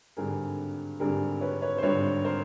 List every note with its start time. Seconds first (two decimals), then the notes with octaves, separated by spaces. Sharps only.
0.17 G#1 G2 D3 G3 G#4 A#4
1.00 G#1 G2 D3 G3 G#4 A#4
1.41 B4 C#5
1.62 B4 C#5
1.78 C5
1.82 G#1 G2 D3 G3 B4 C#5
2.25 A#4 C5